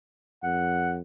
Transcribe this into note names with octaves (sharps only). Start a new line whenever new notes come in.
F2 F#5